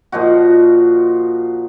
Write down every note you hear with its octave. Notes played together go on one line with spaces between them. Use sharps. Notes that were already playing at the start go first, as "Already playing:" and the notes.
A#2 F3 D#4 F#4